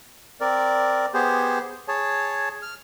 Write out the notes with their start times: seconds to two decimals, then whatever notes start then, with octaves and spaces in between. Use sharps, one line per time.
0.40 C4 A#4 D5
1.14 B3 G4 G#4 C5
1.88 G#4 C#5 A5
2.62 F6